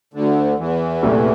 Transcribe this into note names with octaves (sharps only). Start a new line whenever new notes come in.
D2 D3
E2 E3
C2 A#2 A3 E4